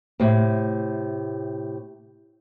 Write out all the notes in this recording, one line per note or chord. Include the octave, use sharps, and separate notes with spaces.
A2 C3